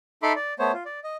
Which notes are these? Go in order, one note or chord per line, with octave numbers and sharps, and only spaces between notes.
D#4 A4 E5 B5 C6 D6
D5
A3 B3 C5 C#5
F4
D5
D#5